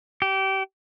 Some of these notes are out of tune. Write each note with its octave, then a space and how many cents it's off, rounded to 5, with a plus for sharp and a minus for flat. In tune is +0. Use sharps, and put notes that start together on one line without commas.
G4 -25